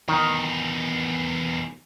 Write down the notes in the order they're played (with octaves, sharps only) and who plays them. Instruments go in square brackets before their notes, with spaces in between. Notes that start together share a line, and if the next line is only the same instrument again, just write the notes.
[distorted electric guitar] E2 D#4 [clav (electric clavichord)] D#3